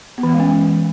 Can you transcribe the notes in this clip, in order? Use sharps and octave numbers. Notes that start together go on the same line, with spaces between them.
B3
E3
B3
G#3
C#4